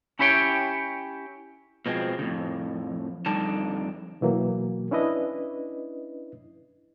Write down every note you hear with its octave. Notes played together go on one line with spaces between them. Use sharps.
C#4 E4 G4 C#5 G5
B2 F3 G#3 C4
F2 A2 C#3
F2 D3 G3 D#4 D5 A5
B2 E3 F#3 A#3
C#4 D4 E4 B4 D#5